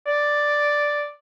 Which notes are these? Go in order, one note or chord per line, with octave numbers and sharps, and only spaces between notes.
D5